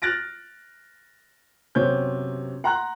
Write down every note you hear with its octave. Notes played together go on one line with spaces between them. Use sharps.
F6 F#6 A6 A#6 D7
F#2 C3 B3 C5 C#5 G6
F#5 A#5 C6 F#6